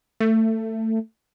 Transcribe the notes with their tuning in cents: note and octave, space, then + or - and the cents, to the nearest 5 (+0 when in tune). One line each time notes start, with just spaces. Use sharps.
A3 +20